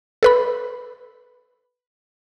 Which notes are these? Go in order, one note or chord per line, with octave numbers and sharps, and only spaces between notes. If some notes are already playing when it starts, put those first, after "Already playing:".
A4 B4 B5